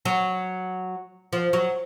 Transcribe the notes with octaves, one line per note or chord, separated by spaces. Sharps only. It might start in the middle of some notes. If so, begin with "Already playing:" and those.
F#3
F3
F#3